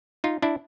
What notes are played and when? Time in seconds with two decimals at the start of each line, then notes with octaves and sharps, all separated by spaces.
0.24 D#4 F4
0.42 D4 E4